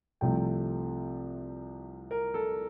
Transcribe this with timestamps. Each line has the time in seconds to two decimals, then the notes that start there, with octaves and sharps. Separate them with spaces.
0.21 C2 C3 F3 A3 G5
2.11 A#4
2.34 A4